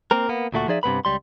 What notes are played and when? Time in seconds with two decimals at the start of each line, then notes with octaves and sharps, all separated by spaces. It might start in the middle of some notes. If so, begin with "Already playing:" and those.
0.11 A#3 C4 A#4
0.29 A#3 B3
0.52 D2 A#2 A3 F#4
0.68 F3 D#4 G#4 D5 E5
0.83 G2 C3 A3 B3 B4 B5
1.05 C#2 G3 C6